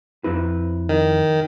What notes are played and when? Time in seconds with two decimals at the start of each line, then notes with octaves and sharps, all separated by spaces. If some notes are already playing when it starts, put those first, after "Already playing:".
0.24 F2 C4 E4 B4
0.89 D#3